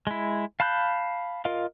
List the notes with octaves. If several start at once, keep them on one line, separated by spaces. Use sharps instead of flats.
G#3 E4
F5 A5 B5 F#6 G6
F4 A#4 D#5 F5